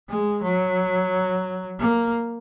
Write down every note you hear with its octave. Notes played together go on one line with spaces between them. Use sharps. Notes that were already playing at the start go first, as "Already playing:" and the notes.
G#3
F#3
A#3